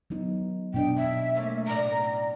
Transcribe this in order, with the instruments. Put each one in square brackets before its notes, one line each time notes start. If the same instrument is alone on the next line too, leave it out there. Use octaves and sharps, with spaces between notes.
[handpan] F#3 B3 D#4
[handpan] B2 D4 D#5 [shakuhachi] G5
[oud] F2 [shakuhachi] E5
[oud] A3 A#3 C#4
[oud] A2 C#3 D5 [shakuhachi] A#5